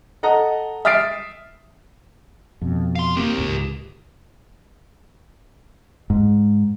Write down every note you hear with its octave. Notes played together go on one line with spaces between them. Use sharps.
A4 D#5 F#5 A#5
E5 D#6 F6 A6 C7 D7
F2 B2
F5 C6
A#3 C4 G4 A#4
C#2 G#2
G#2